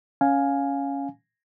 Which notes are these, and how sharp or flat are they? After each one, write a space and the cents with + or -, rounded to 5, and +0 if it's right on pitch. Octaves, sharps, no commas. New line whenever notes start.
C#4 +0 F5 +10 G#5 +0